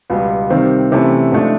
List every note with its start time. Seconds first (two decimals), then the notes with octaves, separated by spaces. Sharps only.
0.10 C#2 B2 G3 B3
0.50 C3 D#3 G3 C4
0.92 C3 E3 A3 C#4 E4
1.32 G#2 F3 A3 D4